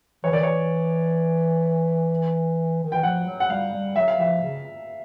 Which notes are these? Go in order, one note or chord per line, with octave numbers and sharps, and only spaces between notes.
E3 C#5
D#3 D5
E3 C#5
D#3
E3 G5
F3 F#5
F#3
F#5
G3 F5
G3
F#3 E5
F5
F3 E5
C#3